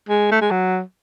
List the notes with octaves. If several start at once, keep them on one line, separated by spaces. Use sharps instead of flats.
G#3
A3
G#3
F#3